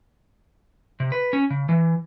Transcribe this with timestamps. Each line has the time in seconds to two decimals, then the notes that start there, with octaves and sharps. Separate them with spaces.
1.00 C3
1.12 B4
1.33 C#4
1.50 C#3
1.69 E3